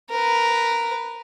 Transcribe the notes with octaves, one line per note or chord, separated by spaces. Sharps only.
A#4 B4